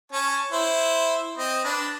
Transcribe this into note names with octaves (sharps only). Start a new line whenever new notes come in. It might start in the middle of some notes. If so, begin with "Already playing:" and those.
C#4 C#5 A5
E4 C5
C4 D#5
D4 B4